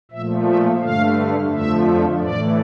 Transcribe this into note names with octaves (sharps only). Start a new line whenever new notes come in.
A#2 F3 A3 E5
E5
G2 D3 A3 F5
F2 D3 F3 A3 E5
A2 E3 A3 D5